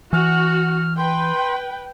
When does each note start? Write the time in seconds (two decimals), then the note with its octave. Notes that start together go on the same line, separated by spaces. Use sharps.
0.13 E3 F#4 F6
0.97 B4 G5 C6